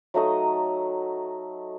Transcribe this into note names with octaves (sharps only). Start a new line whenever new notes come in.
F#3 A3 D#4 D#5